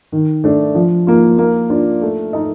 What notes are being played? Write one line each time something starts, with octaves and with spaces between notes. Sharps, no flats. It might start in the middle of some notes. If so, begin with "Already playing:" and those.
D#3
A3 D4
F3
A#3 F4
A#3
D4 F4
A3
D#4 A4 D#5